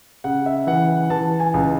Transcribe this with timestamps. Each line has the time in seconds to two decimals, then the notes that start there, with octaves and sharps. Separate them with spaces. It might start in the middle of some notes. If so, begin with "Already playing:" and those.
0.24 C#3 F#5
0.46 E5
0.67 E3 F#5
0.89 F#5
1.10 E3 A5
1.40 G#5
1.54 C#2